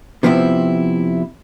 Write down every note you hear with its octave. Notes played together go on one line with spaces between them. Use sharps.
C3 F3 B3 C4 E4